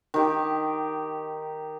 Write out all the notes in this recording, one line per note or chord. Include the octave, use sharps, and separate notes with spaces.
D#3 G4